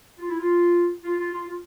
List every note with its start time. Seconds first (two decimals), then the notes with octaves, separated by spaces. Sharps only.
0.19 F4
0.29 E4
0.39 F4
1.04 F4
1.18 F4
1.32 F4
1.47 F4